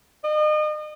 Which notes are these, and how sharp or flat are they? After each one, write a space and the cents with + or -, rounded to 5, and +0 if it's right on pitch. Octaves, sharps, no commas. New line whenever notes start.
D#5 -35